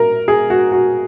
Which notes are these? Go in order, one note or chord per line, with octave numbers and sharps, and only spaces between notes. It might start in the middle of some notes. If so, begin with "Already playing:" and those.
Already playing: A#4
G#4
F#4
F#4